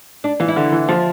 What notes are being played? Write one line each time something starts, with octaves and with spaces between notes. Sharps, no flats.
D4
E3 F4
E4
D3
E3
F3 F4